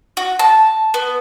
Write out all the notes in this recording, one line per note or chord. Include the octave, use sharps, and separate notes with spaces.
F#4
A5
B3